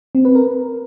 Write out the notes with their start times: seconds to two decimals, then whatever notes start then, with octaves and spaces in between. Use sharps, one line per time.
0.15 C4
0.25 B4
0.35 A#4